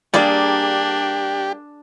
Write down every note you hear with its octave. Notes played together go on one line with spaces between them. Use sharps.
G3 A#3 D4 G4 G#4 D5